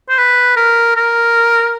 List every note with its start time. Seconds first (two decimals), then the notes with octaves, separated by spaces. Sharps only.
0.09 C5
0.18 B4
0.57 A#4
0.96 A#4